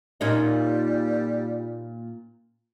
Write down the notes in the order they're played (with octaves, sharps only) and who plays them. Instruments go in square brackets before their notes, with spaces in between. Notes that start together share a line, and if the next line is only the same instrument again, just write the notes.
[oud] A#2 C#4 D#4 [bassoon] G3